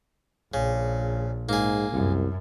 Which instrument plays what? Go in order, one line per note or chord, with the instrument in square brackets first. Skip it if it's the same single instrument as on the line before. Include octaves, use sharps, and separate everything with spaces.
[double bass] A#1 [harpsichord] C#3
[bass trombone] G#2 [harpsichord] A#3 G#4
[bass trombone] C2 [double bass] F#2